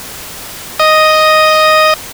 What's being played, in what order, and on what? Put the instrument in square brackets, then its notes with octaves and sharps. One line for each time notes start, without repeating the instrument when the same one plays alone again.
[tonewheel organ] D#5 D#6